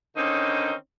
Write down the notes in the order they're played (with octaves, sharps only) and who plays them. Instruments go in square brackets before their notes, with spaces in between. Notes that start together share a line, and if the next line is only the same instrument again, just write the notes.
[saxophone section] D3 D#3 C4 C#4 D#4